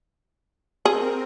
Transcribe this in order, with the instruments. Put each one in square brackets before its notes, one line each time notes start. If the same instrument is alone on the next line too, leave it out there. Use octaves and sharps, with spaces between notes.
[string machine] C4 A#4 [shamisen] G#4